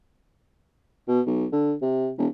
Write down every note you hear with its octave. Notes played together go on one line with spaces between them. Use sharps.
B2
B1
D3
C3
E1